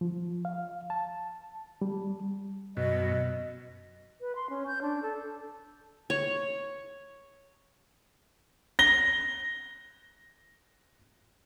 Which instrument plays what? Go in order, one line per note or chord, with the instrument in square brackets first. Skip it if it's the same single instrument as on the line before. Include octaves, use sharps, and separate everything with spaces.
[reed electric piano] F3
F5
A5
G3
[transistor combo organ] F#2 B2 [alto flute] D#5
[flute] B4
C6
C#4
G6
D4
A4
[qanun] C#5
[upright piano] A#6 G7